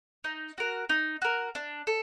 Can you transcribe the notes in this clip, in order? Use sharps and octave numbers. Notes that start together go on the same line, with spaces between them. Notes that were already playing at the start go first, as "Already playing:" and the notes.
D#4
F#4 A#4
D#4
F#4 A#4
D4
A4